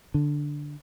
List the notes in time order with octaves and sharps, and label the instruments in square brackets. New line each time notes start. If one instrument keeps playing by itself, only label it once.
[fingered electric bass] D3